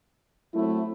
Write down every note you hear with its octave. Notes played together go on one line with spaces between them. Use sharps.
F#3 A3 C4 E4